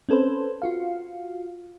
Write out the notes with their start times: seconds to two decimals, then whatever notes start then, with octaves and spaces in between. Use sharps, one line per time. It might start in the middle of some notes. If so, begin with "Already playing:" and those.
0.09 C4 C#4 A4 B4 C5
0.62 F4 F#4 F5